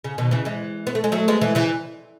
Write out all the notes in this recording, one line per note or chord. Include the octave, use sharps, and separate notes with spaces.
C#3
B2 D#3
C#3 E3
E3 G#3
B3
A3
G#3
F#3 A3
G#3 B3
E3 G#3
C#3 E3